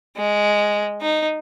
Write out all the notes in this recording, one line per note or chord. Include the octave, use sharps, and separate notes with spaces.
G#3
D#4